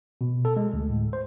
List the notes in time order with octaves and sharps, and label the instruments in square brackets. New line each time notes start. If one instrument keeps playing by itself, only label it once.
[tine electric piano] B2
A4
G#3
D2
A2
C5